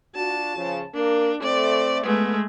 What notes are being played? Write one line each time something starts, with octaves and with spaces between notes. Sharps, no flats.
D4 F4 F#4 A5
C#3 F3
A#3 D4 A#4
A3 C4 D5
G#3 A3 B3